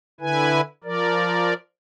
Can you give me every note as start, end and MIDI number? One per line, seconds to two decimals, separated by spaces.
0.21 0.61 50
0.21 0.61 64
0.21 0.61 71
0.21 0.61 80
0.84 1.54 53
0.84 1.54 70
0.84 1.54 74